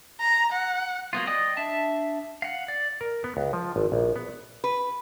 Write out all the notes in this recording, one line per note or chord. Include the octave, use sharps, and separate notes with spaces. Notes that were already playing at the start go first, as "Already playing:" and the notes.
A#5
F#5
F#3 A#3 B3 F4
D5 D#5 G5 D#6
D4 E5 A5
F5 F#5
D5
A#4
B3
C#2
F3
G#1
A#1
B3
B4